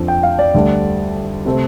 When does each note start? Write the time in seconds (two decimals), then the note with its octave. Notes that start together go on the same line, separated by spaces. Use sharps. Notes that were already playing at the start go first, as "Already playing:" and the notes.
Already playing: F2 F3 D4
0.08 G5
0.23 F5
0.39 D5
0.54 D2 D3 G3 D4
1.45 C3 A3 C4 G4